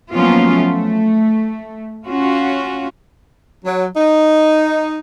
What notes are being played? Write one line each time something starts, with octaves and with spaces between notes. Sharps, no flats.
F3 F#3 A#3 B3 C#4 F4
A3
C#4 F4 F#4
F#3
D#4